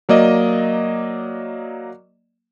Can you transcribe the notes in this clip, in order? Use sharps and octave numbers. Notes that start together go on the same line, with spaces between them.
F#3 A#3 D5 D#5